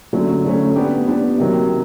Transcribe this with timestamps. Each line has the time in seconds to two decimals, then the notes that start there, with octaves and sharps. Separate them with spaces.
0.13 D3 F#3 A3 C#4
0.44 D3 F#3 A3 C#4
0.76 B3 D4 G4
1.07 B3 D4 G4
1.38 C3 D#3 F#3